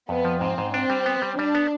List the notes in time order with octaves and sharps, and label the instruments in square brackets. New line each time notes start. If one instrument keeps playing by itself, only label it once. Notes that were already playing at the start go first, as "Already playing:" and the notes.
[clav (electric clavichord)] F2 [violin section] B3
[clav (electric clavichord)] F3
[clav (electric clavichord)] G#2 [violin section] C4
[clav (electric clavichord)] G#2
[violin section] C4 [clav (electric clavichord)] D4
[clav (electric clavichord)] G3
B3
G3
[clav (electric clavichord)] G3 [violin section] D4
[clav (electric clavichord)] B3